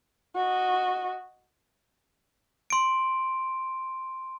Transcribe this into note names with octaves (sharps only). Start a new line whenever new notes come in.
F#4 D#5
C6 D7